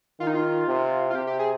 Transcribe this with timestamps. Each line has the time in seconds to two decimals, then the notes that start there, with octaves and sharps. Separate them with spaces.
0.20 D#3 F4
0.27 D#4
0.35 F4
0.68 C3
1.10 F4
1.15 C3 G4
1.27 G4
1.39 G#4